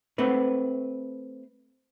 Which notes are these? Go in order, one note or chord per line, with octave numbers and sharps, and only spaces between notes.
A3 C4 B4